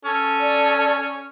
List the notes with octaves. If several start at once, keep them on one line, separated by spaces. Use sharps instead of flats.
C#4 A4
D5